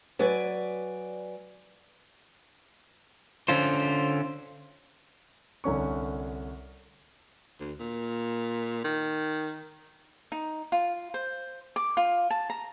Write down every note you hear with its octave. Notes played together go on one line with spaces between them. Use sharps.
F#3 B4 D5 G#5
D3 C#4 F4 C5
C2 D3 C#4 C#6
D2
A#2
D#3
D#4
F4
C5
D6
F4
A5
A#5